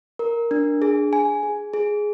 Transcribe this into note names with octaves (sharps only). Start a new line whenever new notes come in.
A#4
D4
G#4
G#5
G#4
G#4